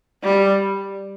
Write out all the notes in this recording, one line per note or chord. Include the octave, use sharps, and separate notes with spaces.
G3